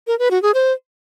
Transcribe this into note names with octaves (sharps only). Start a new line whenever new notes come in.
A#4
B4
F#4
G#4
C5